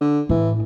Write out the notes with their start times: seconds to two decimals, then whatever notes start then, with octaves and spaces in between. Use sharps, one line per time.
0.01 D3
0.29 A2 E3